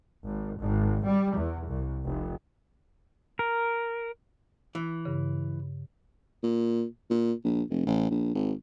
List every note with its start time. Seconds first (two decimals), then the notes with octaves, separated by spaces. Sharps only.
0.24 G#1
0.59 G#1
1.06 G3
1.37 E2
1.68 C2
2.04 F1
3.39 A#4
4.75 E3
5.05 G2 C#3
6.43 A#2
7.10 A#2
7.44 A#1
7.70 F1
7.87 A1
8.11 A#1
8.35 G#1